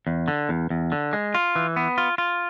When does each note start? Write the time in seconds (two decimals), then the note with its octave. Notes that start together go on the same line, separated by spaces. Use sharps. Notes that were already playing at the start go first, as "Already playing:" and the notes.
0.07 E2
0.28 D3
0.49 E2
0.70 E2
0.92 D3
1.13 G#3
1.35 F4
1.56 E3
1.76 B3
1.98 F4
2.18 F4